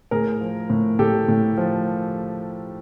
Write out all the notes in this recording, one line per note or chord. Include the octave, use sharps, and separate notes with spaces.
A2 G#4 A#4
F3
A2
A2 G4 A4
A2
F3